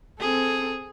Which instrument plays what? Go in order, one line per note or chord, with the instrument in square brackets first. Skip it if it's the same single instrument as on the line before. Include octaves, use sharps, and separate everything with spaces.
[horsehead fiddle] C4 A4 [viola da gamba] G#4